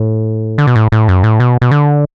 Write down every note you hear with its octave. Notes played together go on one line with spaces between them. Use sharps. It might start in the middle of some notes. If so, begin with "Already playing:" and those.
Already playing: A2
D3
B2
A2
A2
F#2
A2
B2
B2
D3